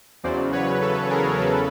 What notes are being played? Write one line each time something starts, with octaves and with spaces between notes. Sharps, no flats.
E2 C#3 F#3 C5 D5
B4 C#5
A4 B4
G#4 A#4
E2 C#3 A4 B4